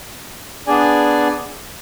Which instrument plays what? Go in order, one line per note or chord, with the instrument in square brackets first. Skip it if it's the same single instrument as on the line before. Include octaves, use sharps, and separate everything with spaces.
[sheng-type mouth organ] B3 D4 G#4 D5 G#5